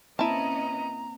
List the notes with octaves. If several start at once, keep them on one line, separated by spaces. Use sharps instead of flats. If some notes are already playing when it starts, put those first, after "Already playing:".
A#3 C4 C#4 E4 B4 D#5 A5 A#5